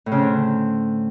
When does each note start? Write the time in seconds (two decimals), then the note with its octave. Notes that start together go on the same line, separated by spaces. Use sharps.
0.06 A2
0.12 C#3
0.17 C4
0.22 D3